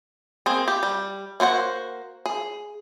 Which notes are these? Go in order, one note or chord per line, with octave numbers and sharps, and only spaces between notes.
A#3 C4 G#4
G4
G3
A#3 F#4 C5 F#5
G#4